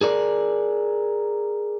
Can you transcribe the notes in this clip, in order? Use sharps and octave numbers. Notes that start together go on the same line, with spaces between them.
G#4 A#4 D5